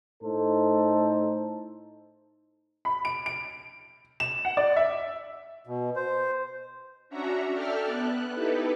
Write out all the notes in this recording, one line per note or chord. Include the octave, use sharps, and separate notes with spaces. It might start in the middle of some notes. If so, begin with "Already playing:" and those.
A2 D#4 A4 C5
B5
D7
D7
E7
F#5
D5
E5
B2
C5
C#4 D4 F#4 E5 F#5 A#5
A4 D5 E5 G5 A5 F6
B3 F#6
D#4 E4 G4 A4 B4